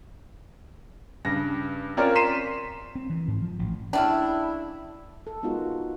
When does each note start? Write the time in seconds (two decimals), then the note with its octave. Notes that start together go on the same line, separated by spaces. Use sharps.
1.25 G2 C#3 A#6
1.97 C4 C#4 F4 A#4 C#5 D5
2.15 A#5 C6 B6 C7 D#7 E7
2.95 C4
3.10 E3
3.28 G#2
3.42 F3
3.59 A1
3.93 C#3 A3 C#4 D4 E4
5.27 A4
5.43 G#3 B3 D#4 F4 F#4 A#4
5.71 F4